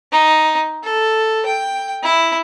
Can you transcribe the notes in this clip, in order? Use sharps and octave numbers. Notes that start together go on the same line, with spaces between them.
D#4
A4
G5
E4